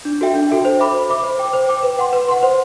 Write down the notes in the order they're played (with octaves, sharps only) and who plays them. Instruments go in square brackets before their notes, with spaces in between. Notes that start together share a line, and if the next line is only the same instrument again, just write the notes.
[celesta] D4
F#4 A4 E5 G5
D4
F#4 A4 E5 G5
C5
E5 B5 D6
C5
E5 B5 D6
C5
G5 D6
C5
G5 D6
B4
F#5 C6
B4
F#5 C6
C5